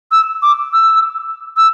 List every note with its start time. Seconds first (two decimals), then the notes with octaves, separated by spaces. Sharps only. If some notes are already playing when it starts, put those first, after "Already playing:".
0.12 E6
0.42 D6
0.73 E6
1.57 E6